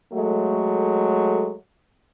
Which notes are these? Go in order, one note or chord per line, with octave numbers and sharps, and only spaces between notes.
F#3 G#3 A3